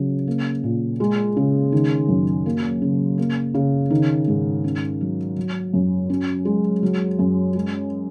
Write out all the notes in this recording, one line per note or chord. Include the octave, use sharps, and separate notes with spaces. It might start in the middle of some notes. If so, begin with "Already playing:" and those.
Already playing: C#3 F#3
A#3
A#2
G#3
C#3
D#3
F#2
A#3
C#3
A#3
C#3
D#3
G#2
C#4
F#3
F#3
F#2
C#4
G#3
F#3
F#2
G#3